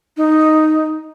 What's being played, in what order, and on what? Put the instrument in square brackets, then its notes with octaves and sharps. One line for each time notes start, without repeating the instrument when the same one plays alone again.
[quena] D#4